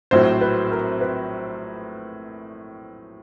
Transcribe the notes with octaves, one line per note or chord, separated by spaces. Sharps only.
A#1 A2 F#3 C4 C5
B4
A#4
B4